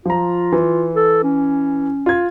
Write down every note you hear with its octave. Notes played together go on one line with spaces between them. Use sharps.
F3 F4 A#5
E3
A4
C#4
F4 G#6